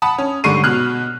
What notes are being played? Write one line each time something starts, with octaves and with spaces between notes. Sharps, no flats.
F#5 A5 B5 D#6
C#4
G#2 D3 G3 C#6 C7 D#7
B2 F6 F#6